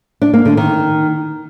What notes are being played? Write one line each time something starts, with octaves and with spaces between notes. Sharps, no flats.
D4
A#3
D3
D#3